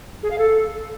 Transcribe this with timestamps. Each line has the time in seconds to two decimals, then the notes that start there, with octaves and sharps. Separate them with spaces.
0.23 G#4
0.30 F5
0.38 A4